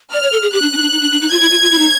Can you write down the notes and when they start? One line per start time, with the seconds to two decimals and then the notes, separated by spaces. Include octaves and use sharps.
0.13 D5 F6
0.23 C#5
0.32 A4
0.42 G#4
0.53 G4 F#6
0.62 D4
0.73 C#4
0.77 D#4
0.82 D4
0.92 D#4
1.01 D4
1.12 D4
1.21 D#4
1.31 F4 G#6
1.41 E4
1.51 F4
1.62 F4
1.71 E4
1.78 D#4